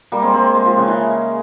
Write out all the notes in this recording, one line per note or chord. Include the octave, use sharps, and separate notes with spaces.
G3 A#3
G#3 C4
G#3 C4
G#3
F3
C#3
E3